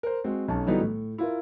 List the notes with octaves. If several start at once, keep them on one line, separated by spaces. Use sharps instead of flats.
A#4 C5
G#3 C4 F#4
B1 C#4 A5
D3 E3 F#3 G3 B3 D#4
A2
E4 F4 A#4